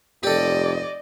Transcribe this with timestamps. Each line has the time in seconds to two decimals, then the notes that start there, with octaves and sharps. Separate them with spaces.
0.23 F1 G4 A4 D5 D#5